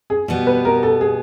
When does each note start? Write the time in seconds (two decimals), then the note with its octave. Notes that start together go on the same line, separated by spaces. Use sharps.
0.10 G#4
0.28 B2 G3 B3
0.47 B4
0.65 A#4
0.83 A4
1.01 G#4